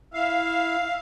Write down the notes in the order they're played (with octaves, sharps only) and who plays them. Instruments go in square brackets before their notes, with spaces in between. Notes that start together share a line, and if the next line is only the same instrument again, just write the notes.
[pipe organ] E4 E5 [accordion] F5